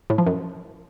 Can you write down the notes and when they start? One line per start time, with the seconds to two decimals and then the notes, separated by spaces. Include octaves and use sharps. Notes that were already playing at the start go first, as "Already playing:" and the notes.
0.10 A2
0.18 F3
0.27 F#2